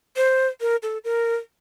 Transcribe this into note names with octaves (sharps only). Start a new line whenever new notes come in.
C5
A#4
A4
A#4